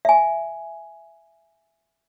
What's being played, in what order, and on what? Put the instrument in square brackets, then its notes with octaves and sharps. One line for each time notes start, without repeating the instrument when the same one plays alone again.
[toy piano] E5 G#5